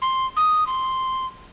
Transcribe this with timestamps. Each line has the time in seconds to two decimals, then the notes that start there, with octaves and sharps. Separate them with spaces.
0.02 C6
0.36 D#6
0.67 C6